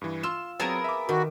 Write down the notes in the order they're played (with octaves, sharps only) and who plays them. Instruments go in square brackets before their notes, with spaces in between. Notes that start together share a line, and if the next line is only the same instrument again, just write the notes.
[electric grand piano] G2 E3
[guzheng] F4 [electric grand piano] C6 E6 E7
[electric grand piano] F#3 C4 [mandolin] B3 G#4 A#4 [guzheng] A5
[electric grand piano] E5 D6
[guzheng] D#3 [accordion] F#4